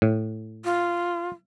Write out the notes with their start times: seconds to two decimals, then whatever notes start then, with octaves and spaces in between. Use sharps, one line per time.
0.02 A2
0.64 F4